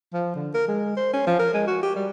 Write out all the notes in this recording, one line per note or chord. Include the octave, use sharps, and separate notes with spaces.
F3
D3
A#4
G#3
C5
C#4
F3
A#4
G#3
F#4
G4
G3